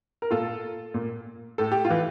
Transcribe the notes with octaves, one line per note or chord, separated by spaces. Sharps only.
A#4
A#2 F4 A4
A#2
A2 A4
G4
F4
E3